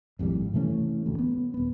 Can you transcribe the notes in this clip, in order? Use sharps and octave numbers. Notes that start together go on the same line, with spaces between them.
G#1 F2 A2 G3
C3 E3 A3 C#4
A1 D2
B3
D#1 B3